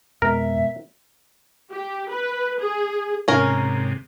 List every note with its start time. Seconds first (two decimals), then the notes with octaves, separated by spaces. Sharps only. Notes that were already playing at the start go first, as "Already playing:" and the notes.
0.22 F2 B2 G#3 A#4 E5
1.71 G4
2.11 B4
2.60 G#4
3.28 G#2 C3 C#4 A#4